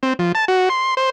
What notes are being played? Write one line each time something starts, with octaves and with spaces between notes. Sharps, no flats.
C4
F3
A5
F#4
C6
C5